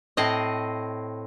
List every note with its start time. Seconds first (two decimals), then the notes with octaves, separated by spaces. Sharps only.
0.17 A2 C4 D#5